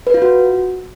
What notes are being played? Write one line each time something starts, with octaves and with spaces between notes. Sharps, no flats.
B4
F4
F#4